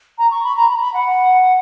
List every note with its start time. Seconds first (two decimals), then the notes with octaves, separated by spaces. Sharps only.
0.18 A#5
0.31 C#6
0.44 B5
0.57 A#5
0.70 B5
0.77 A#5
0.81 B5
0.94 F#5